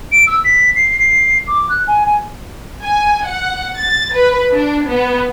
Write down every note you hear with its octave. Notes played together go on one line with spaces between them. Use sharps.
D7
E6
B6
C7
C7
D6
F#6
G#5
G#5
G#5
F#5
A6
B4
D4
B3